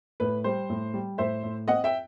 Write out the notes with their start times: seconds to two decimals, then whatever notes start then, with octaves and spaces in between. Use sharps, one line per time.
0.20 A2 B4
0.44 G3 C5
0.70 A2
0.94 G3
1.18 A2 C5 E5
1.43 A2
1.68 C4 D#5 F#5
1.84 E5 G5